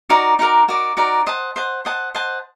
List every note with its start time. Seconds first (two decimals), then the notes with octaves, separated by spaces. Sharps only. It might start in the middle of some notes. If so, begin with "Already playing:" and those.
0.09 D#4 F#4 A#4 D5
0.39 D#4 F#4 A#4 D5
0.68 D#4 F#4 A#4 D5
0.97 D#4 F#4 A#4 D5
1.26 C5 D#5 F#5 A5
1.56 C5 D#5 F#5 A5
1.85 C5 D#5 F#5 A5
2.15 C5 D#5 F#5 A5